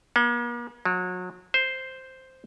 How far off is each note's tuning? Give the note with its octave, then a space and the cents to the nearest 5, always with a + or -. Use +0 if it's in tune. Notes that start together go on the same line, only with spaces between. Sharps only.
A#3 +45
F#3 -30
C5 +0